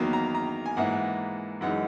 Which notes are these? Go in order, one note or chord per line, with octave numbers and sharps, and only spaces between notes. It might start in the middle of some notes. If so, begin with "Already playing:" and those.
Already playing: E2 D#3 F#3 A#3
A#5
A#5
G#5
G#2 E3 A#3 E4 F#5
F#2 E3 G#3 D#4 F#5